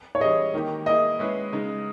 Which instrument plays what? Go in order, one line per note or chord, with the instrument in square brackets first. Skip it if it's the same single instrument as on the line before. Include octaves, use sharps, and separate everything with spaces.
[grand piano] C#5
[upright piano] E3 G3 C#4 G#4 [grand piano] D#5
[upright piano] D#3 A#3 D#4 G4
[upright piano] A#3 E4 G#4 [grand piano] D#5
[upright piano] G#3 C#4 E4 G#4 B4
C#3 G#3 D#4